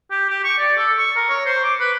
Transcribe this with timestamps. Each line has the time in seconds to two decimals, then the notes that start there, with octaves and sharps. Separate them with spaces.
0.11 G4
0.29 G4
0.44 C#6
0.58 D5
0.77 A4
0.98 C#6
1.16 A#4
1.29 C#5
1.45 C5
1.64 D6
1.80 B4